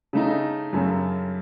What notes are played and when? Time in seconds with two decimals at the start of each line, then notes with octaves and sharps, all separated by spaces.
0.13 C#3 A3 D#4
0.73 F#2 C#3 F#3 A3